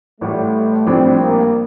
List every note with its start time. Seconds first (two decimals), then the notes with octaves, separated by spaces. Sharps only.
0.21 A1 A2 G3 A3
0.87 A#1 A2 G3 C4 D4
1.20 A#3